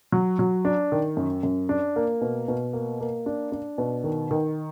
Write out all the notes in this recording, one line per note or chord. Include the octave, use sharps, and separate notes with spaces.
F#3
F#3
D4
D#3
F#2
F#2
D4
A#3
B2
B2
A#3
A#3
D4
D4
B2
D#3
D#3